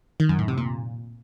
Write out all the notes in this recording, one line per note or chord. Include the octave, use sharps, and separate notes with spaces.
D#3
F#2
A2
C3
A#2